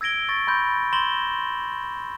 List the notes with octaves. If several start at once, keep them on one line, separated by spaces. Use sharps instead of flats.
E6 G#6 A#6 D7 G7
C#6 A6 A#6
B5 C6 G6
C6 G6 A#6 E7 F#7 G7